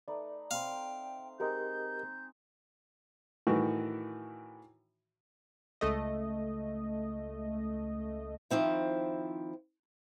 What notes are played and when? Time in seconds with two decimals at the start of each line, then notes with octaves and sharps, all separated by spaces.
0.08 A3 D#4 B4 D5
0.51 C4 F5 G5 C6
1.40 G#3 C4 D#4 G4 A#4 D#5 G6
3.47 A2 D#3 E3 F#4 C#6
5.81 C#2 A3 D#5
8.50 D#3 F3 C4 E4